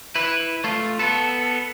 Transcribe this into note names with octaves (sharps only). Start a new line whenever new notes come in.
E4 B4
A3 F4
B3 A4